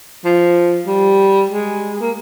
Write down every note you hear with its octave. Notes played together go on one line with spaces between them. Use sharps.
F3
G3
G#3
A#3